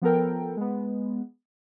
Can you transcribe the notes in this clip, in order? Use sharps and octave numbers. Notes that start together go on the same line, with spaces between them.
F3 B3 A4 A#4 G5
G#3 B3